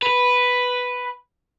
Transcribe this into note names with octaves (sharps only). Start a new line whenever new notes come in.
B4